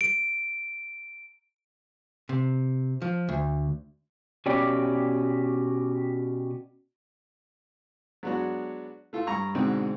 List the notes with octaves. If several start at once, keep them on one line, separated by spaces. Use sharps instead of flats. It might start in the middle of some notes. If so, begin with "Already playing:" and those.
D7
C3
F3
D2
B2 C#4 G4 D5
F#3 G#3 B3 D4 F#4
A3 F4 A4
G2 A#5 C#6
G#2 B2 D3 G#3 C4 D#4